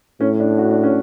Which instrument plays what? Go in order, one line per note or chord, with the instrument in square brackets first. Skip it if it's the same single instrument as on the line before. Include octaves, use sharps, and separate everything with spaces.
[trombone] A2 [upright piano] C#4
[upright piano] D4
F#4
D4
C#4